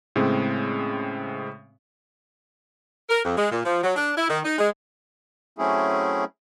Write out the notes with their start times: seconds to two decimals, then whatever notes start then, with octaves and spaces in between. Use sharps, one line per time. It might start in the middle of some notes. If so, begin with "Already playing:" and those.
0.16 A2 C#3 G#3 C4
3.09 A#4
3.23 F2
3.37 G#3
3.51 A#2
3.64 F3
3.82 F#3
3.96 D4
4.16 E4
4.28 D#3
4.44 D#4
4.58 G#3
5.59 F#3 A3 C4 C#4 E4 G#4